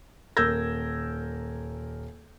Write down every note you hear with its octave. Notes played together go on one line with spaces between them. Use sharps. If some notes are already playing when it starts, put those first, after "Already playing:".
D#1 A#4 E6 G6 G#6 A#6